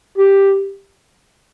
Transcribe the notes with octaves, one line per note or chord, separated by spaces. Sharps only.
G4